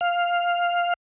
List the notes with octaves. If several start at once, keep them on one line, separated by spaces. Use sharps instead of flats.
F5